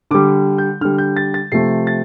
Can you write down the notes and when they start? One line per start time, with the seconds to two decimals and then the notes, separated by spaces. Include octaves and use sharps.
0.11 D3 G3 D6
0.58 G6
0.81 D3 G3 F6
0.98 G6
1.17 A6
1.34 A6
1.52 C3 F3 A3 C7
1.87 A6